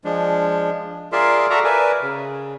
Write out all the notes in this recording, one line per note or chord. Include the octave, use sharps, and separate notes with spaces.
F3 G#3 D4
F4 G#4 A#4 D5 E5 C6
F#4 A4 D5 E5 A#5
A#4 B4 D5 E5 G#5
C#3